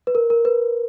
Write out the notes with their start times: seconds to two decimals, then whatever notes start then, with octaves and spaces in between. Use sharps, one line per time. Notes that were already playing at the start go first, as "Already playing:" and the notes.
0.07 B4
0.15 A#4
0.30 A#4
0.45 B4